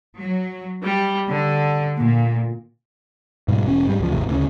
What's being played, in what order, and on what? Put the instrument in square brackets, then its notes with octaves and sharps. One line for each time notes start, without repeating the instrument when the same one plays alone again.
[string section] F#3
G3
D3
A#2
[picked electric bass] G#2 B2 G3
E1 C#4
G#2 G3
C#2 F3
G#1 D#2 A2 C3
D2 A2 C#3